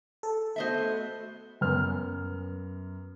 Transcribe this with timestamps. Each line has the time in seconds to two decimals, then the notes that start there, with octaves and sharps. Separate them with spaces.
0.23 A4
0.56 A3 B3 F#4 C5 D#5 E5
1.61 F#2 B3 F6